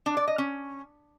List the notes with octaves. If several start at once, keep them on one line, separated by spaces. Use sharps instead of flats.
D4
D5
D#5
C#4